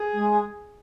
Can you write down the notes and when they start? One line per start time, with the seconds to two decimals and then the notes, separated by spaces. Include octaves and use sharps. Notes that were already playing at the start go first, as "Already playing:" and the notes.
Already playing: G#4
0.13 G#3